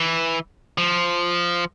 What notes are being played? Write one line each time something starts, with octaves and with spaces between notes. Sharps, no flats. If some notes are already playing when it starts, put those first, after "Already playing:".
Already playing: E3
F3